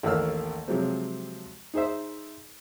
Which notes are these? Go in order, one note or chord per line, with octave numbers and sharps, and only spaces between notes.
A1 D#2 A#3 A4 E6 F6
C3 F3 F#3 G#3 C4
D#4 G#4 C5 E5